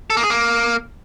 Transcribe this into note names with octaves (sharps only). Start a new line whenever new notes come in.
A4
A#3
G#4
A#3